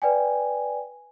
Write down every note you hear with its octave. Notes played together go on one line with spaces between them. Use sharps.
B4 D5 G5 G#5